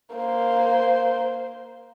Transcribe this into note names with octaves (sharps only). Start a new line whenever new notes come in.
A#3 C5